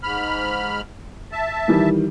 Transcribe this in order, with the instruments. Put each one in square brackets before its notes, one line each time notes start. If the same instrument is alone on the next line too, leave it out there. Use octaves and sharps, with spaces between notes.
[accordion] G#2 B5 F6
E5 A5
[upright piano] D#3 E3 G3